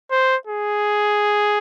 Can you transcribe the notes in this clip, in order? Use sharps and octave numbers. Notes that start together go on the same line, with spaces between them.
C5
G#4